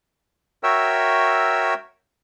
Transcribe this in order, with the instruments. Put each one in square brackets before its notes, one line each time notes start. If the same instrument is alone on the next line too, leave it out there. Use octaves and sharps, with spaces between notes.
[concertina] F#4 A#4 C#5 E5 G5 E6